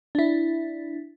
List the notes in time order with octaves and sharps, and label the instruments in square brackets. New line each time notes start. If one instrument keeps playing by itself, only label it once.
[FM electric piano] D4 E4